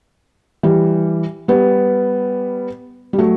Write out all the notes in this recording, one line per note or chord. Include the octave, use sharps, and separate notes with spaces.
E3 G3
G3 B3
G3
F#3 A3